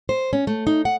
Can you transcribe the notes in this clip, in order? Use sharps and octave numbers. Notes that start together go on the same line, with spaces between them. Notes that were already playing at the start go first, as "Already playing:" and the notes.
C5
C#4
A3
D#4
F#5